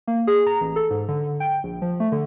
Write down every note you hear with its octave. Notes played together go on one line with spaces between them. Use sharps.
A#3
G#4
A#5
A1
A4
G#2
D3
G5
A#1
F3
A3
D3